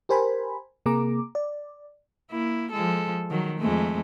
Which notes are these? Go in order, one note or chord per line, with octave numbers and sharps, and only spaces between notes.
G4 A#4 C5 G#5 B5
C3 A#3 G#4 A#5 D6
D5
A#3 E4
F3 G#3 A4
D#3 F#3
F2 G#3 A3